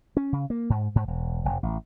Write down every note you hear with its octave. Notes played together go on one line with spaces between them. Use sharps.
C#4
C#3
A#3
G#2
G#2
E1
F1
A1